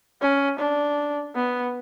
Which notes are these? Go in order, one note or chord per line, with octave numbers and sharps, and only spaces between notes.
C#4
D4
B3